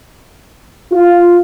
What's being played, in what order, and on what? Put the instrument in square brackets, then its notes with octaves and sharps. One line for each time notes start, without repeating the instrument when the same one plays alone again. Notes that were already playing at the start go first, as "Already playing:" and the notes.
[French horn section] F4